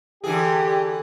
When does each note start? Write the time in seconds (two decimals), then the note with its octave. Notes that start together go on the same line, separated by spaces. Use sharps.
0.24 D3 E3 G4 G#4